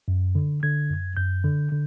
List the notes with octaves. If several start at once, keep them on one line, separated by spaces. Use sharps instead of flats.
F#2
D3
D3 G#6
F#2
F#2 G6
D3
D3